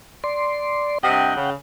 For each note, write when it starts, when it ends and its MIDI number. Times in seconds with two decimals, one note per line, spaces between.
0.24 0.98 74
0.24 0.98 84
1.03 1.35 43
1.03 1.35 48
1.03 1.35 75
1.03 1.50 78
1.03 1.50 79
1.36 1.53 49